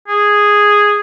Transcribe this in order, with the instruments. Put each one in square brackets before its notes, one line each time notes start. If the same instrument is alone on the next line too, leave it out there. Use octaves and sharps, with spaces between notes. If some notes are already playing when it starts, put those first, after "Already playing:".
[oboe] G#4